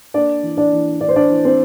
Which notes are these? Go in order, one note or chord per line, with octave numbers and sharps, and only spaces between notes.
A#3 D4 D5
E3
D4 D5
E3
D4 D5
C5
D4 D5
E3
C4 C5